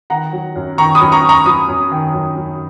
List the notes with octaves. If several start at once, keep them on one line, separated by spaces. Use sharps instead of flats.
D#3 F#5 A#5
F#3
F#2
D#3 A#5 C#6
B5 D#6
F#2
A#5 C#6
F#2
A#5 C#6
F#3 B5 D#6
F#2
D#3
F#2
F#2